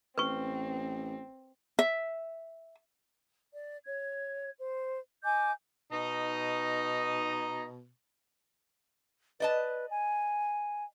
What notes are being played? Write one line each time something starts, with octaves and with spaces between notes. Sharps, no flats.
A1 C4 B4 C#6
E5
D5
C#5 G#6
C5
D#5 G#5 D6 G6
B2 D#4 D#5 A#5
B4 D5 D#5 A5
G#5